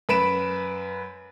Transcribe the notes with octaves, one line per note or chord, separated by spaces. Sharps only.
F#2 B4 B5 D7 E7